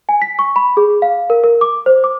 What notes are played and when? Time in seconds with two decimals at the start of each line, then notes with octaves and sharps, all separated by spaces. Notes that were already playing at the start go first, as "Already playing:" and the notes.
0.09 G#5
0.22 B6
0.39 C#6
0.56 B5
0.77 G#4
1.02 F5
1.30 A#4
1.44 A#4
1.61 D6
1.86 C5
2.04 D6